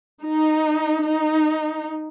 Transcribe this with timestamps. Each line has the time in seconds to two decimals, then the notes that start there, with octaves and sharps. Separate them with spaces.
0.26 D#4
1.04 D#4